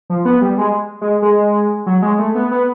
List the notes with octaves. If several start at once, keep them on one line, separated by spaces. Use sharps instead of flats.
F3
B3
G3
G#3
G#3
G#3
F#3
G#3
A3
B3
B3